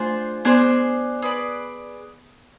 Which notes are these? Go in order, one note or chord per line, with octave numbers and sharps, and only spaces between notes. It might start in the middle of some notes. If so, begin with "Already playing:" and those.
Already playing: A3 D4 F4 G#4 C5
B3 D4 G#4 C5
G#4 B4 D5